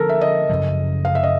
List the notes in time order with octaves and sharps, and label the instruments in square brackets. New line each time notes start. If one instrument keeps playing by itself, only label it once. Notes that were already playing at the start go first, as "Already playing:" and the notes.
Already playing: [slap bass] D3 F3 A#3 [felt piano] A4 A#4
[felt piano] E5
D#5
[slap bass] F#2 C#3 F3
[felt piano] F5
E5
D#5